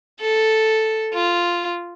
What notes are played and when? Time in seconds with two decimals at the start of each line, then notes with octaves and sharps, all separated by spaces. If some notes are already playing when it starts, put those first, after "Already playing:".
0.20 A4
1.13 F4